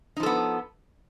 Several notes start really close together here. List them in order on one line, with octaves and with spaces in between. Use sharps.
D#4 F3 A4 B3